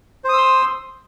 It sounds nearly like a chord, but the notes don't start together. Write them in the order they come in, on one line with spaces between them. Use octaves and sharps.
C5 D#6 E6 C6